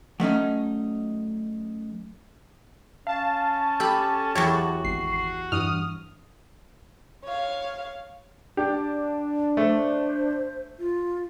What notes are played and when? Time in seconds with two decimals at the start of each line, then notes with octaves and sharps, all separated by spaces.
0.20 F#3 A3 C#4 D#4
3.07 C#4 F5 A5
3.80 G4 A4 B5
4.35 E2 F#3 F#4 G4 C#5
4.85 G#1 C7
5.52 G2 E3 D#6 F6
7.25 C#5 F5
8.57 D4 G4
9.57 A3 C5
10.79 F4